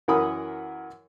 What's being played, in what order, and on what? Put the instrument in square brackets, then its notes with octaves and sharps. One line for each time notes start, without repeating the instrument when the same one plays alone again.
[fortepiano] F#2 E3 A#4 F#5 B5 D#6